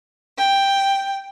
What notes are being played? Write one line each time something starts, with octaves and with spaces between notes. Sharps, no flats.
G5